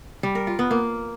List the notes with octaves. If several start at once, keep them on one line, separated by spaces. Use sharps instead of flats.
G3
A#4
F4
B3
A#3